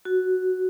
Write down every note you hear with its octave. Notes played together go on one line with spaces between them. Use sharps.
F#4